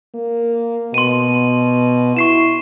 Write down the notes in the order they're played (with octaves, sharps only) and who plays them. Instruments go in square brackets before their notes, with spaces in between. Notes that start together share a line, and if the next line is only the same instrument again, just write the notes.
[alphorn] A#3
[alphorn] B2 [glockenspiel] C6 D#7
[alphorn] E4 [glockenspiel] C#6 C7 E7